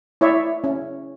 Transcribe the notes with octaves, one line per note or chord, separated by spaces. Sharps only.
E4 C#5 D5 E5
C#4